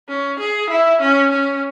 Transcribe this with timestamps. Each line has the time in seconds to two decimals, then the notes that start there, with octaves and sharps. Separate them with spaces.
0.08 C#4
0.39 G#4
0.70 E4
1.01 C#4
1.31 C#4